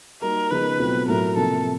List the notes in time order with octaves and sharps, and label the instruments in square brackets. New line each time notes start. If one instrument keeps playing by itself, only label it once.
[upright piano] G3 A#3 D#4 F#4 [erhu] A#4
[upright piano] C#3 F3 G#3 B3 D#4 [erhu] B4
[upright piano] B2 F#3 A3 C4 F4
[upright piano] A2 F#3 A3 [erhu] A#4
[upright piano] C3 F3 A#3 [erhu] A4